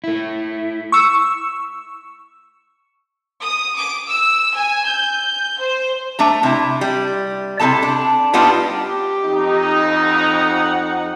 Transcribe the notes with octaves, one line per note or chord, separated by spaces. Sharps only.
A3 E4
C#6 E6
D#6
D6
E6
G#5
G6
C5
A3 D4 A#5
C3 E4
G3
C3 D4 E4 A4 A5
D4
G3 B3 D4 D#4 F4
G4
F2 D#4
F#5